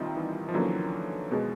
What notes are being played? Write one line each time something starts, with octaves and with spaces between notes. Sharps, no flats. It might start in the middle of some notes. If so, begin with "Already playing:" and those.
Already playing: C2 A#2 D#3 G3 C4 D#4
E3
F3
D3 E3 F#3 A#3 C#4
B2 G#3